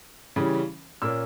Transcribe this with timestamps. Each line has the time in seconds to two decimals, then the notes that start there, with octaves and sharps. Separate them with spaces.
0.36 C#3 E3 G3 C#4
1.02 A#2 A#3 C#4 E6